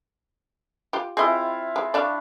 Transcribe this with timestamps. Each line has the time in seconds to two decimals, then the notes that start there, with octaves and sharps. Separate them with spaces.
0.93 F4 G4
1.17 C4 E4 F4 G#4 D#5
1.76 G#3
1.94 D4 D5 E5 F5 C#6